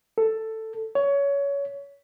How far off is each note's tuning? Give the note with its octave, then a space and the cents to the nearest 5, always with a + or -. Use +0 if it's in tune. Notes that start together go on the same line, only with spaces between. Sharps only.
A4 +10
C#5 +20